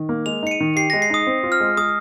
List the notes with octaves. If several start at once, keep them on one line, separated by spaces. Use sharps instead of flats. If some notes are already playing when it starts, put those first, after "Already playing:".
Already playing: D#3
A#3
G#3 F7
D#4 C#7
D#7
D#3
G4 C7
A#6
G#3
C7
D#4 D#6
C4
F4
F6
G#3
G#3 D#6